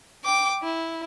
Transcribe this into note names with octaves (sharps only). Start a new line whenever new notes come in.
G5 D6
E4